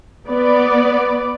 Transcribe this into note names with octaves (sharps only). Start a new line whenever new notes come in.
B3 D5